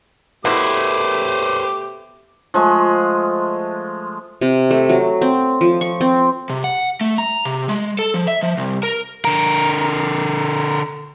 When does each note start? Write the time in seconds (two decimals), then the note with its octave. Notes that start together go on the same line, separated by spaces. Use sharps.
0.45 B2 A3 E4 G4 B4 C5 D6
2.54 F3 G#3 A3
4.41 C3
4.71 A3
4.89 F#3
5.22 C4
5.61 F3
5.81 C#6
6.01 C4
6.50 C3
6.64 F#5
7.01 A3
7.18 A#5
7.45 C3
7.69 G#3
7.99 A4
8.14 F3
8.28 E5
8.43 F3
8.57 C2
8.83 A#4
9.25 D3 A#4